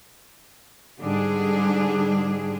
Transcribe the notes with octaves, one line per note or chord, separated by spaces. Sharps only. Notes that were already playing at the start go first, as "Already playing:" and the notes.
G#2 D3 G3 D4 G#4